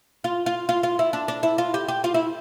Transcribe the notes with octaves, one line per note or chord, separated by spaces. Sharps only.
F4
F4
F4
F4
E4
D4
D4
E4
F4
G4
G4
F4
E4